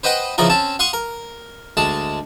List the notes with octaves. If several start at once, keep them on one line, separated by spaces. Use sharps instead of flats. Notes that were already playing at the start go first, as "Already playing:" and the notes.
B4 C5 D#5 F#5 G5
C#3 E3 F3 D#4 F4 A#4
C4 C#4 A5
F5 F#5 C6 C#6 D#6
A#4
D2 G#3 A5